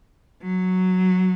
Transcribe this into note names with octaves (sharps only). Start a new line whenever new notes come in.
F#3